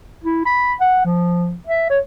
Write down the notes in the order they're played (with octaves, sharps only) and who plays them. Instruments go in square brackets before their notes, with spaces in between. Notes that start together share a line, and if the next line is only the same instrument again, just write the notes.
[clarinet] E4
B5
F#5
F3
E5
C#5